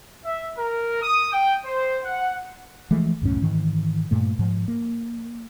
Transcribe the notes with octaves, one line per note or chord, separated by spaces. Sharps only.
E5
A#4
D#6
G5
C5
F#5
E3 F3 G#3 A3
C2 F#2 A2 C#4
G#2 D#3 E3
G2 A#2 A3
G#2 F3
A#3